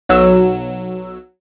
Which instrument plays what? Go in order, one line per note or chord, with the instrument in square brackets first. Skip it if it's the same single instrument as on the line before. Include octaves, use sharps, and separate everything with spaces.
[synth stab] B1 F#3 E6